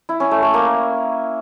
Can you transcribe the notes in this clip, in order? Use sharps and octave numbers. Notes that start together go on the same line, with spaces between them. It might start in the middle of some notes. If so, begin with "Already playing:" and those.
E4
C#4
A3
A3
A#3